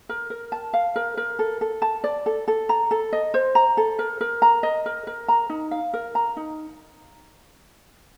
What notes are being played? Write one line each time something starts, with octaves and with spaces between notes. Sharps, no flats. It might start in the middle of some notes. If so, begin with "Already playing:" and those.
A#4
A#4
A5
F5
A#4
A#4
A4
A4
A5
D5
A4
A4
A#5
A4
D#5
C5
A#5
A4
A#4
A#4
A#5
D#5
A#4
A#4
A#5
D#4
F5
A#4
A#5
D#4